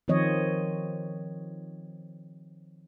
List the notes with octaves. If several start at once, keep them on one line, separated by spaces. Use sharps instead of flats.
D#3 F3 C4 C#5 D#5